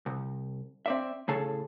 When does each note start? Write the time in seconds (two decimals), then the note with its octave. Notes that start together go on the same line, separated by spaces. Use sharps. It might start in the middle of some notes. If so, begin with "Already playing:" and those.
0.06 C2
0.86 C4 D5 E5
1.28 A2 C#3 G#4 A4 A5